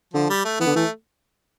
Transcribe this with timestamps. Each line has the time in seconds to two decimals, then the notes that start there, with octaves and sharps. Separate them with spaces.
0.13 D3 F3
0.30 G3
0.45 A3
0.60 E3 B3
0.67 D3
0.75 E3 A3